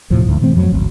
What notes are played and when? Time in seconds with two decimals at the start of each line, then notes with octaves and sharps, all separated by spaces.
0.10 D#2 A2 C3 F3
0.26 D2 G#2
0.41 B2 E3 A3 C4
0.55 F2 F3 F#3
0.72 G#1 D2